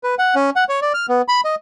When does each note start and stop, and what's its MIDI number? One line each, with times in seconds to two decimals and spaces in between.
0.04 0.15 71
0.19 0.35 78
0.35 0.50 61
0.56 0.64 78
0.69 0.80 73
0.82 0.93 74
0.94 1.06 89
1.09 1.22 59
1.28 1.41 83
1.45 1.55 75